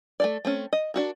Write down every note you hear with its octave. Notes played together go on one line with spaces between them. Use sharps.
A3 A4 D5
A3 C4 C#4
D#5
D4 F#4 A#4